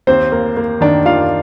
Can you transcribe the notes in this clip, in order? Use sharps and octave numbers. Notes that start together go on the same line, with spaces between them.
D#2 C4 C5
A#3
A#3
D#3 D4 D5
D#2 F4 F5